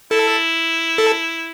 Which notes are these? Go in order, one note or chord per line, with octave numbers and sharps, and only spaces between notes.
E4 A4
A4